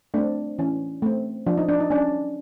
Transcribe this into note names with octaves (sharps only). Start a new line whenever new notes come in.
A3 C4 D4
E3 C#4
A3 C4
F3 D4
D#4
D4
D#4
C#4 D4